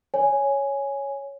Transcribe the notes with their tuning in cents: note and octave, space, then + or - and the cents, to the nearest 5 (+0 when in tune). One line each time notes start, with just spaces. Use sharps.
C#5 +0 G#5 +0